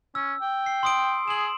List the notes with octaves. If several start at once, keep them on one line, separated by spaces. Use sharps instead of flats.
C#4 E6
G5
C7
C6 D#6 D7
G#4 E7 F#7